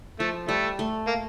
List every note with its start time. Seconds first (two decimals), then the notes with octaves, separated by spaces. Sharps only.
0.20 F3 A3
0.48 G3 A3
0.79 A3
1.08 A#3